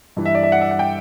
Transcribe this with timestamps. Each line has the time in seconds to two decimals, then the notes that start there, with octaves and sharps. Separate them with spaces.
0.17 G2 E3
0.25 E5
0.35 D5
0.43 E5
0.52 F#5
0.61 E5
0.71 F#5
0.79 G5